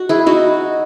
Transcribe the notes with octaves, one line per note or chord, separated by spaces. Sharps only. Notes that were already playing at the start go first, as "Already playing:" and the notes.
Already playing: F#4
E4 G#4
D#4 F#4